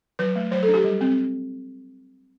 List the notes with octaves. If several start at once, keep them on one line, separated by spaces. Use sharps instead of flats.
F#3 B4
A3
F#3 C5
A4
D4
G4
G3
C4